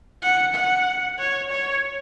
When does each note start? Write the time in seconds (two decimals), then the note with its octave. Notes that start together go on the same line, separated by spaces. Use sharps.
0.23 F#5
0.55 F#5
1.19 C#5
1.51 C#5